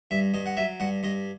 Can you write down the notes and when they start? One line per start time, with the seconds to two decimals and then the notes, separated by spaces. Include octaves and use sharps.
0.11 G2 E5
0.34 G2 D#5
0.46 F#5
0.57 F#3 E5
0.80 G2 F#5
1.03 G2 D#5